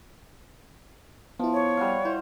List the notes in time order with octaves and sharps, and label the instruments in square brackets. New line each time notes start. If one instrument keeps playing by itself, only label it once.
[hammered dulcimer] F3 [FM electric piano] B3 E4
[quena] C#5
[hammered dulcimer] G3 F#4 F5
[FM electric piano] E4 [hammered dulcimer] C5